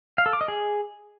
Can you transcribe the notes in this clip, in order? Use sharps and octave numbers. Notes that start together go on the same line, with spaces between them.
F5
A4
D6
D#5
G#4